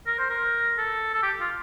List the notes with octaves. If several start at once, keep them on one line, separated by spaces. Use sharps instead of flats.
A#4
C5
A#4
A4
A4
G4
F4